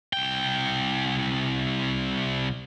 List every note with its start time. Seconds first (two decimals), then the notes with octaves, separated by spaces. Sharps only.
0.13 C2 G5